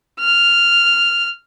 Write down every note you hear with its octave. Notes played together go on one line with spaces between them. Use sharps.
F6